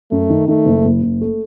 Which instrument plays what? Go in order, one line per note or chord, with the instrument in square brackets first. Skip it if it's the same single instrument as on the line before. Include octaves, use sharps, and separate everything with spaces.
[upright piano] F#2 [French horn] A3
[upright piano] D#3
[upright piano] D#3 [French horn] A3
[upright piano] F#1
F#1
F#1
A3